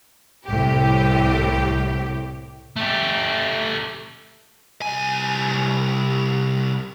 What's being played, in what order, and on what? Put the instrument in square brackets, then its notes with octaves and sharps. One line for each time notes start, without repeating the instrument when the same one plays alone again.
[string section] C2 A2 G4
[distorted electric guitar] A3 G4
[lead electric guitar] C2 G#5